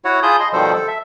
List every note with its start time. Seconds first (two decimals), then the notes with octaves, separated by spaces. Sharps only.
0.05 E4 F#4 C#5 F#5
0.23 F4 G#4 A5 B5 D#6 G6
0.40 D#5 C6
0.53 B2 D#3 F3 G3 A4 C5
0.74 A4
0.88 E5